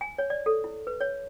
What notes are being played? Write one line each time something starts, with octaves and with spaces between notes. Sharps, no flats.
G#5
C#5
D5
A4
E4
B4
C#5